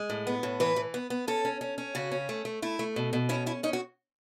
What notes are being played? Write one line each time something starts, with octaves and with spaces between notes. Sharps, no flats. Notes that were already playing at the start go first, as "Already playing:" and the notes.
Already playing: G#3
A2
B3
A2
E3 B4
E3
B3
B3
C#4 A4
C#4
C#4
C#4
C#3 F#4
C#4
A3
A3
A3 E4
A3
B2
B2
C#4 E4
C#4 E4
C#4 D#4
F#4